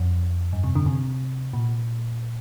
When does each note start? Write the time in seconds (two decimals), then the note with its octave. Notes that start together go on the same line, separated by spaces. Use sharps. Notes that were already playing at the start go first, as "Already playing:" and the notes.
Already playing: F2
0.53 G2
0.64 C3
0.75 D3
0.86 C3
1.53 A#2